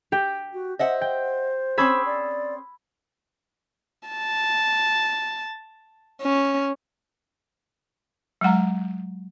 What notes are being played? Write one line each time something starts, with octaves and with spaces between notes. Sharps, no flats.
G4 G5
F#4
C5 D#5 E5 F#5
G5
C4 C#4 G#4 B5 E6 G#6
D5
A5
C#4
F#3 G#3 F#5 A#5